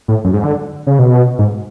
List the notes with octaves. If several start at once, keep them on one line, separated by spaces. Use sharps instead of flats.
A2
F#2
G#2
D3
C#3
B2
G#2